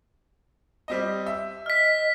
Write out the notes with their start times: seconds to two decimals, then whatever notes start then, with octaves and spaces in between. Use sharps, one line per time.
0.88 G3 C4 D#5
1.26 E5
1.66 D#5 F6 B6